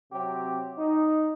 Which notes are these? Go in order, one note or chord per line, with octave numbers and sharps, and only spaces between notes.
C3 F#3 C4 G4
D#4